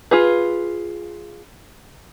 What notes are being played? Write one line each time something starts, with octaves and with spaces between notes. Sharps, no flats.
F4 G#4 B4